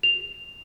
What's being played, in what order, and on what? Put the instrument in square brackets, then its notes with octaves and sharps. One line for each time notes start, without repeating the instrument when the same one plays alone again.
[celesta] F7